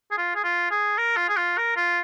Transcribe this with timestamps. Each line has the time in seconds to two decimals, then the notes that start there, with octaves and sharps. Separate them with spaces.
0.11 G#4
0.18 F4
0.35 G#4
0.44 F4
0.71 G#4
0.98 A#4
1.17 F4
1.29 G#4
1.37 F4
1.57 A#4
1.76 F4